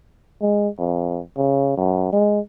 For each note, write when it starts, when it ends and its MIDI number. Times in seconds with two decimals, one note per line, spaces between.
0.42 0.68 56
0.79 1.21 41
1.37 1.74 49
1.77 2.12 42
2.13 2.40 56